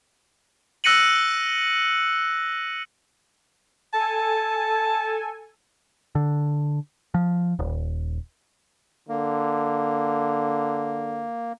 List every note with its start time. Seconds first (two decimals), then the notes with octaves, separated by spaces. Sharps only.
0.84 E6 F#6 A#6 C#7 D#7 F#7
3.94 A4 G#5 A5
6.15 D3
7.14 F3
7.59 D#1
9.09 D3 A#3